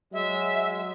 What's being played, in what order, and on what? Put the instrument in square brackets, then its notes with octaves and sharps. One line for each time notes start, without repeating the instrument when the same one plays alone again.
[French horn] F#3 [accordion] G#3 [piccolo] E5